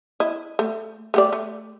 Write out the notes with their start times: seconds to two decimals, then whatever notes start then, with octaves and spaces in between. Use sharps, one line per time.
0.20 E4 D#5
0.59 A3
1.14 A3 G4 D5
1.33 A3